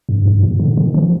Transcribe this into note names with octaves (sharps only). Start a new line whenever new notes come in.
G2
G#2
G2
A#2
D3
D#3
F3